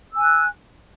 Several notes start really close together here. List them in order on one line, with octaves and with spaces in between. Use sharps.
E6 G#5 F#6